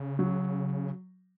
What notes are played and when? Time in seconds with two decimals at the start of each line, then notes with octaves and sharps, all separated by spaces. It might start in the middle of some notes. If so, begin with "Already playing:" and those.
Already playing: C#3
0.19 F#3